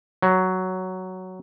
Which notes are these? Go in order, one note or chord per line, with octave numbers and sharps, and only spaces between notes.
F#3